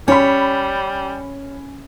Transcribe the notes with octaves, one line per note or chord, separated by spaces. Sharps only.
G3 C#4 C#5 B5